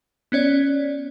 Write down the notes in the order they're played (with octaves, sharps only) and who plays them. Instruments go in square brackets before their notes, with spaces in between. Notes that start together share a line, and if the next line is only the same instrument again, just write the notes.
[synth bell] B3 C#4 C#5 D5